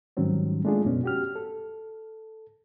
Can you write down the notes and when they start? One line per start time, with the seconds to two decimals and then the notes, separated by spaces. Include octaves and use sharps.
0.17 G#2 D#3 F#3 G3 C4 C#4
0.65 G#3 A3 D4 F4 G#4
0.85 F#2 B2 B3 C#4
1.04 F#4 G4 F6
1.36 A4